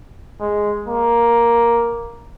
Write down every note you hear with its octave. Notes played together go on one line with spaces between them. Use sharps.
G#3
A#3